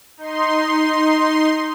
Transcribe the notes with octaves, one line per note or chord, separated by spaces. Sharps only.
D#4 C6